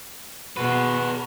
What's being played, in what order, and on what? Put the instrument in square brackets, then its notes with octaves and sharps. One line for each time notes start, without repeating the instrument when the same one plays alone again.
[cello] B2 [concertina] F#4 [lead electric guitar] G#4 B4